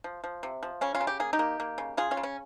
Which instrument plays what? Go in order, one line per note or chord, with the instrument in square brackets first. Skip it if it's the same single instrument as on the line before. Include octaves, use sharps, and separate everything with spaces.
[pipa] F3
F3
C3
F3
C#3 C#4
C#4 F4
C#3
G4
A#3 G#4
D#4 G4
A#3
A#3
C#3
C#3 F4 G#4
C#4 F4
C#3
C#4